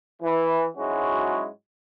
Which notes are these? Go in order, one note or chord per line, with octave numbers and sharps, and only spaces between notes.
E3
G#2 F#3 G#3 C#4 E4 F#4